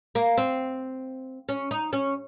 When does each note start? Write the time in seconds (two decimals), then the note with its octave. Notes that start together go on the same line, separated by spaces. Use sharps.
0.15 A#3
0.37 C4
1.49 C#4
1.71 D#4
1.93 C#4